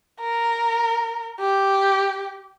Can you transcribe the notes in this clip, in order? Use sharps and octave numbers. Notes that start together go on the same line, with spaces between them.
A#4
G4